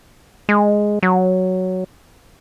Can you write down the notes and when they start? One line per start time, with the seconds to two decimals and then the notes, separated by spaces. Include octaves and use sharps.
0.49 G#3
1.03 F#3